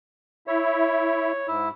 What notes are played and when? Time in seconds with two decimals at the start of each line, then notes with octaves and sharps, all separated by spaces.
0.47 E4 C#5 E5
1.48 G#2 E4